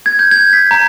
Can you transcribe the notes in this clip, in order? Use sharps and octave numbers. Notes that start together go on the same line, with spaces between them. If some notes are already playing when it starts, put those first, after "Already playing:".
G#6
G6
G#6
B6
A#5